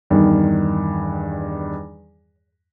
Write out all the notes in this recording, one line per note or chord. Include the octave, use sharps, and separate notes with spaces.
E2 G2 D#3